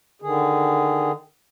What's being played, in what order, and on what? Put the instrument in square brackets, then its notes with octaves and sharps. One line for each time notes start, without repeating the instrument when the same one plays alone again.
[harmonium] D3 D#3 G#4